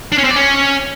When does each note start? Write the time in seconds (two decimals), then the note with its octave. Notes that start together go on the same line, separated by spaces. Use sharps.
0.12 D4
0.18 C#4
0.24 C4
0.30 D5
0.36 C#4